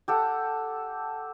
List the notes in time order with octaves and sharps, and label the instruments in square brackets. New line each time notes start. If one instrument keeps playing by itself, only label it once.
[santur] G4 A4 F#5